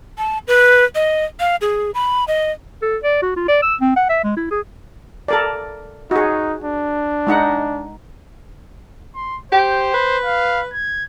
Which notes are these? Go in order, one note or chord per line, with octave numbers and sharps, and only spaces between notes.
A5
B4
D#5
F5
G#4
B5
D#5
A4
D5
F#4
F4
D5
E6
C4
F#5
E5
G#3
E4
G#4
A4 A#4 D5
D#4 F#4 G#4
D4
G#3 D#4 F#5
C6
G4 C5
B4
F5
G#6